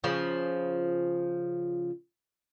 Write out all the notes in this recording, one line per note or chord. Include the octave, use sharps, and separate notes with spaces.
C#3 F3